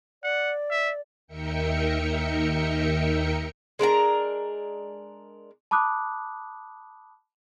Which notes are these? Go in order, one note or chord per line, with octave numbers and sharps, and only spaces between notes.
D5 F#5
E5
D#2 D#4 A#4 E5 G5 C#7
G#3 D4 A#4 A#5
A5 B5 D6 D#6 F#6